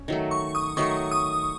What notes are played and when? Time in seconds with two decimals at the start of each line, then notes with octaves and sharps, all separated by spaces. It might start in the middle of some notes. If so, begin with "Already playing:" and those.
Already playing: C#4
0.08 D#3 F#3 A3
0.31 C#6
0.55 D#6
0.77 D#3 F#3 A3 C#6
1.11 D#6